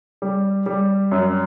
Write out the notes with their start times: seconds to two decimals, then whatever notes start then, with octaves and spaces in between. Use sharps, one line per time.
0.22 G3
0.66 G3
1.11 F#2